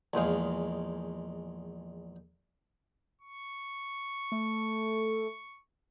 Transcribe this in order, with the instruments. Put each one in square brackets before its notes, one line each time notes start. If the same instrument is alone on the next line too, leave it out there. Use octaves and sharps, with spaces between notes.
[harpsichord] A#1 E2 G#3 F5
[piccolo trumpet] C#6
[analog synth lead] A3